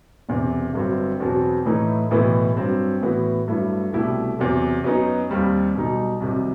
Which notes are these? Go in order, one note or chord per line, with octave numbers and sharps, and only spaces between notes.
E1 E2 C3
G1 G2 F#3 C4
E2 B2 F#3 C4
A2 E3 A3 D#4
B1 A2 E3 B3
G2 F#3 C4
A2 E3 B3 F#4
G2 F#3 A3 E4
C2 B2 A3 E4 G4
E2 C3 F#3
F#2 F#3 B3 D#4
D#2 D#3 G3 C4
B1 B2 G3 D#4
C2 C3 D#3 F#3